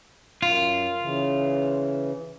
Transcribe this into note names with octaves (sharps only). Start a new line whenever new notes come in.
F#2 F4
C#3 E3